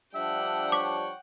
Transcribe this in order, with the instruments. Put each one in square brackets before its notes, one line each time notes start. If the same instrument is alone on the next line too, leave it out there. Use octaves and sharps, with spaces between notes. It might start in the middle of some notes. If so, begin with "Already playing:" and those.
[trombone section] F3 G3 D4 [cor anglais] E5 [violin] F#5 G5
[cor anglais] C#5 [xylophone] D6 B6